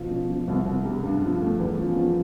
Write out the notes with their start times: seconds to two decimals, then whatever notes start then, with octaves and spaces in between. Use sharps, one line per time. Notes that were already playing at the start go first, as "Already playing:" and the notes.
Already playing: B2 F3
0.11 F3
0.30 F3
0.48 C2
0.66 C2
0.85 G3
1.03 G2
1.22 F3
1.41 A3
1.59 E2
1.77 F3
1.96 F3